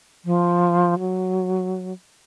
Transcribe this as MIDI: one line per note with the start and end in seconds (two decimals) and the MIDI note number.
0.25 0.98 53
0.99 1.93 54